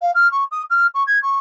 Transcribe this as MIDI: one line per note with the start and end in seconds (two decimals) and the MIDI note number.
0.01 0.11 77
0.14 0.29 89
0.31 0.44 85
0.51 0.62 87
0.70 0.86 89
0.94 1.03 85
1.07 1.19 92
1.22 1.39 85